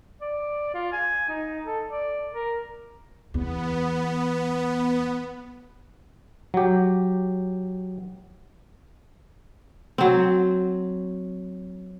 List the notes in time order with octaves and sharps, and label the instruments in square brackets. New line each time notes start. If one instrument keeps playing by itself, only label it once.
[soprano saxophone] D5
F4
G#5
D#4
A4
D5
A#4
[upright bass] E2 [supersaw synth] B3
[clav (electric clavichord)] F#3 G4
[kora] F#3 C4